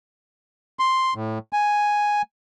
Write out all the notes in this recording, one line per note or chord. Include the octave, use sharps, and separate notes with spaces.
C6
A2
G#5